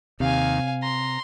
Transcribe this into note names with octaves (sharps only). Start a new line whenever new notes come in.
D#2 C3 F5 G#5
A#5 C6